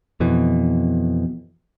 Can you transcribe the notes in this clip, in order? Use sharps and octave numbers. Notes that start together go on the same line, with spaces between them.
F2 B2 E3